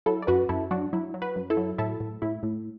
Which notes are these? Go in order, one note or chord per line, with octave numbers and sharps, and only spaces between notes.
F#3 E4 A4
D5
F#2 F#4 B4
F#2 E4 A4
F#3 D4 F#4
F#3 E4
F#3
F#4 B4
F#2
E4 A4
F#3
A2 E4 A4
A2
A2 E4
A2